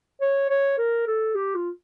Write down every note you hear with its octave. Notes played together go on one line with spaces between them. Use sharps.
C#5
C#5
A#4
A4
G4
F4